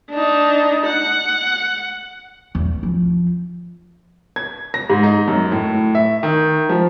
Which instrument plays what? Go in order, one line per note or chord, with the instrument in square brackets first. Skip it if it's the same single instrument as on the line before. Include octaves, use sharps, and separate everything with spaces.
[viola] D4 D#4
F#5
[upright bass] E2
F3
[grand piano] G#6
A#6
G#2
D#4
F#2
A2
E5
D#3
F3